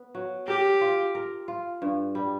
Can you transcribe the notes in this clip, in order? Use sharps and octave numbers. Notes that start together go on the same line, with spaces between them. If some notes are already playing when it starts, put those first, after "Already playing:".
Already playing: B3
F#3
G4 A#4
F4
A#4
F4
G2
G3